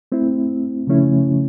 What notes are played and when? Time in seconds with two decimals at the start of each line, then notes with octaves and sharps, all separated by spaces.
0.12 A3 C4 E4
0.87 C#3 F3 A3 C#4 E4